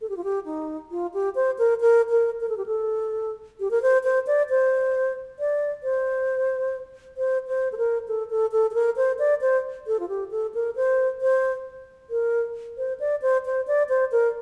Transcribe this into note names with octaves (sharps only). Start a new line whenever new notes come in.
A4
G4
F4
G4
D#4
F4
G4
C5
A#4
A#4
A#4
A#4
A4
G4
A4
G4
A#4
C5
C5
D5
C5
D5
C5
C5
C5
A4
A#4
A4
A4
A4
A4
A#4
C5
D5
C5
A4
F4
G4
A4
A#4
C5
C5
A#4
C5
D5
C5
C5
D5
C5
A#4